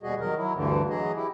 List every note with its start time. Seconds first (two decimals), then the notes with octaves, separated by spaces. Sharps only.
0.03 D#2 B2 G3 F#4 G#4 D#5
0.20 D#3 F#3 A#4 D#5
0.37 F#3 E4
0.55 D2 G2 D3 E3
0.90 E3 F#3 G#4 D#5
1.16 E4 G4